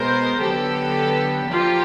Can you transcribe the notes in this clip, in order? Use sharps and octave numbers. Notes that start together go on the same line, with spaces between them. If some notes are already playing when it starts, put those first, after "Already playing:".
Already playing: B2 G#3 B3 A#4 C5
D3 F#3 B3 G4 A4
A#2 F3 A#3 F4 G4